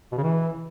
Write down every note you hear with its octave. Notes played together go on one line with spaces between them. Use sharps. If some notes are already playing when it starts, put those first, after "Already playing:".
B2
C#3
E3